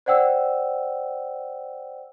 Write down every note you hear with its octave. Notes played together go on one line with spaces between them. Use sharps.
C5 D5 F#5 G5 E6